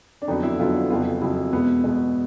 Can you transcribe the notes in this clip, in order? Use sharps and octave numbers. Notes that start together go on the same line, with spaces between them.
D4
F2 D3 F#3 B3 D#4
E4
F2 D3 F#3 B3 F4
F2 C#3 F#3 B3 F4
F2 C#3 F#3 B3 E4
E2 B2 G#3 B3
E2 B2 G#3 B3